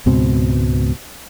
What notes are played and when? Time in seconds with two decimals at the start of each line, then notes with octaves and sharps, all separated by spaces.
0.06 C#2 G#2 B2 C4